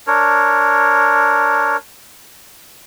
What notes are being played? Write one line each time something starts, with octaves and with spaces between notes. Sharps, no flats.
D4 A#4 C#5